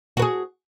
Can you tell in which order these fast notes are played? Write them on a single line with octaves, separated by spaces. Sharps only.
F#4 B4 G#4